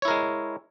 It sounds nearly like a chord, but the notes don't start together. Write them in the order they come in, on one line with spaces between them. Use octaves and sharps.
C#5 E4 A#4 G#3